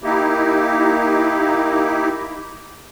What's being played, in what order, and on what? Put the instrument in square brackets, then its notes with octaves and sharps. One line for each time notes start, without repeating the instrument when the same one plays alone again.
[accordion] A#3 D#4 E4 G4